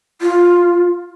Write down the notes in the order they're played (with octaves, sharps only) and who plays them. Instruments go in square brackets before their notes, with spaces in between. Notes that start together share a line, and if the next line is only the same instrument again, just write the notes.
[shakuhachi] F4